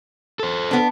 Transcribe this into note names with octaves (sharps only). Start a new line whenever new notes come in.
A4 C5
B3 D4